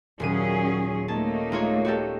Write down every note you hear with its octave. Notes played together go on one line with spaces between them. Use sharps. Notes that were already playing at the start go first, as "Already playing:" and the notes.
D#1 A#2 F#3 C#4 G#4 D#7
A3 A#3 C#4 D#4 A5
G#3 F4 C#5
F#4 G4 A4